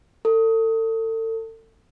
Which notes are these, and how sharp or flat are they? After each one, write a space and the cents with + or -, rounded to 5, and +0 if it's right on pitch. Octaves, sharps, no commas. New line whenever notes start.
A4 +35